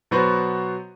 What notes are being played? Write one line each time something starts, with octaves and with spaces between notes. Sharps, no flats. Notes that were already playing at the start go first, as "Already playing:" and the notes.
B2 F#3 B3 F#4 C5